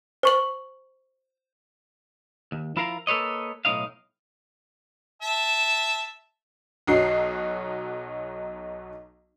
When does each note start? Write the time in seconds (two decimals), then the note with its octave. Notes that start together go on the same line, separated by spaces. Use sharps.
0.23 C5 C#6 F#7
2.52 D#2
2.76 F3 E4 F4 A#4 F5 A#5
3.07 A#3 A4 B4 C#5 D#5
3.65 B1 A2 D#4 D#5 F5
5.22 E5 A5
6.87 B1 F#3 D#4 F#4 C7